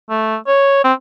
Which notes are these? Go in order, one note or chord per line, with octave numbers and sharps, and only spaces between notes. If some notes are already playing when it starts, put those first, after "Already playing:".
A3
C#5
C4